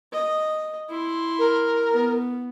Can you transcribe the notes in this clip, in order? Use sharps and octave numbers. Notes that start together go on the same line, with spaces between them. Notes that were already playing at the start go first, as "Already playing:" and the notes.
D#5
E4 C6
A#4
B3